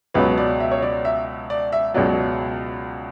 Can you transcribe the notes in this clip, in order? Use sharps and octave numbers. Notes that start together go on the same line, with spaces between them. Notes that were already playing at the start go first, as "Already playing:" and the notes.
C#2 B2 F#3 B4
D5
E5
C#5
D5
E5
D5
E5
C#2 B2 F#3 D5